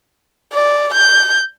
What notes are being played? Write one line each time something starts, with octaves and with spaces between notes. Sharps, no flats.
D5
G6